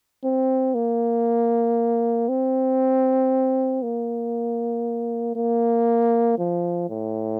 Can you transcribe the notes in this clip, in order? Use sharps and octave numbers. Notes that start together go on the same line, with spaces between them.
C4
A#3
C4
A#3
A#3
F3
A2